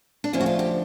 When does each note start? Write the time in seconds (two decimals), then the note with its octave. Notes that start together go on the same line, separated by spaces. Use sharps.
0.24 D4
0.33 D2 D3 F3 C#4
0.41 F#4
0.46 F4
0.59 G4